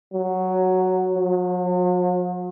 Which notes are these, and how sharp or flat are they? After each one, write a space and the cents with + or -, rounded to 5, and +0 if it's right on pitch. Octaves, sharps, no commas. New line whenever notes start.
F#3 +0
F#3 -45